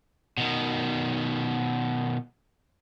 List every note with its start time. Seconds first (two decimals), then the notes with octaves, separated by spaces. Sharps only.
0.38 B2 D#3